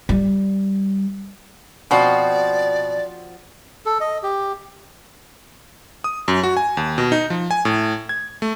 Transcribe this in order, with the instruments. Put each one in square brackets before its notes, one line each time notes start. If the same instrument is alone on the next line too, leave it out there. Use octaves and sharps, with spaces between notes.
[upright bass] G3
[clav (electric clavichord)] B2 [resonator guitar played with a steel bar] F3 C4 F#4 [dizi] D5
[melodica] A4
D#5
G4
[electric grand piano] D#6
F#2
F#4
G#5
D#2
B2
D#4
F3
G#5
A2
G#6
A3